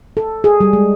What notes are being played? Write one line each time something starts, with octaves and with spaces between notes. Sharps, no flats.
A4
G#4
G3
G#3